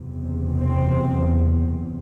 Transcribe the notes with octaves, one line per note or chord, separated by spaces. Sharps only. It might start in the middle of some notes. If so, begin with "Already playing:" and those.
Already playing: F#1 E2 C3
C4